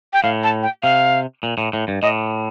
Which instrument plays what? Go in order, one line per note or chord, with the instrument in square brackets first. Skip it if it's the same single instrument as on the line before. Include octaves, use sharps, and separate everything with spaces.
[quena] G5
[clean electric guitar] A2 [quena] F5
[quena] A5
G5
[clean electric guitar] C3 [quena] F5
[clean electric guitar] A#2
A2
A2
G2
[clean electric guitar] A2 [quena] D#5